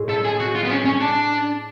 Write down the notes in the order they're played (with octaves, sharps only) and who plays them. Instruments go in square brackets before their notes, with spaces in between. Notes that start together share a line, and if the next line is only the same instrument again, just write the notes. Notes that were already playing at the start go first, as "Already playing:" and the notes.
Already playing: [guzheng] A2 G#3
[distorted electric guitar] A4
G#4
F#4
F4
B3
C#4
C#4
D4